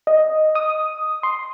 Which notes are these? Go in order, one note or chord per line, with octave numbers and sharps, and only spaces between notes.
D#5
D#6
C6